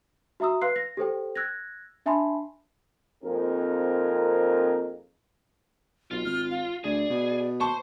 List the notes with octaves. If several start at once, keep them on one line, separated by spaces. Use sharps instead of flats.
F#4 E5 A#5 D#6 E6
B4 F5 C6 E6 F#6 C7
A#6
G4 A4 C5 G5
E6 F#6 G#6 A#6
D4 E5 G#5 A5 B5 C6
F2 A#3 C4 D#4 G#4 A#4
B1 F4
G#1 F6
F5
D2 G#4 D5
B2
C5 A5 C6 C#6